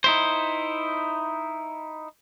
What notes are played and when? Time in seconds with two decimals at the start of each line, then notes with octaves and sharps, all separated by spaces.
0.04 D#4 E4 C5